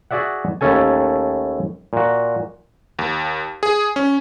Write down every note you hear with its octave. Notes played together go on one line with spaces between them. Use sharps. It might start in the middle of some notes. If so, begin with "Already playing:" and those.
F#4 G#4 D5 E5 F#5
D#2 A3 C#4 A4 G#5
A#2 F#4
D#2
G#4
C#4